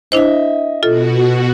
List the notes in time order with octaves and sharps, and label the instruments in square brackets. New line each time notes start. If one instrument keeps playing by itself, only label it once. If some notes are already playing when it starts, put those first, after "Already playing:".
[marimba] D4 E4 C5 [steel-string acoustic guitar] D#5 E5
[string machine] B2 F#4 [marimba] F4 A4